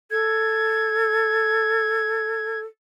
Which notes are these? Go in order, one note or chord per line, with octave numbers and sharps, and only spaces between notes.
A4 G#6